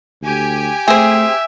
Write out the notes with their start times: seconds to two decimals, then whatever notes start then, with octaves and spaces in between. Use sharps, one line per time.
0.22 D2 G4 G#5
0.88 A3 C4 G#4 E5